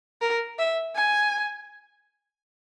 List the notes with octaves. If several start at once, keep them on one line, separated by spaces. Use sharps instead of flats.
A#4
E5
G#5